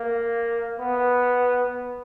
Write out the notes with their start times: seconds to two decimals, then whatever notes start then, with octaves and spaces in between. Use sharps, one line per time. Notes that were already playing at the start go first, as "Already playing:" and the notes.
Already playing: A#3
0.79 B3